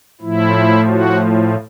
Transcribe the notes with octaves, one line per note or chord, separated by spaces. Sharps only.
A2 F3 E4
F#4